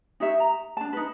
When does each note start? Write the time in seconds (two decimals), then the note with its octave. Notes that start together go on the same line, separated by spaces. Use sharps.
0.20 D#4 G4 C#5 E5
0.40 A#5
0.77 D4 A5
0.93 D#4 B4